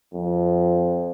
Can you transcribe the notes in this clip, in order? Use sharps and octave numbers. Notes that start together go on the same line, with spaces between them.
F2